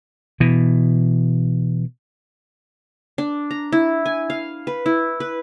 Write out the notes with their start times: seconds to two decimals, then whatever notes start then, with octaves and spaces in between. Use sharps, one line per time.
0.40 B2 E3
3.18 D4
3.51 A#5
3.72 E4
4.06 G#5
4.30 F5
4.67 B4
4.86 E4
5.20 B4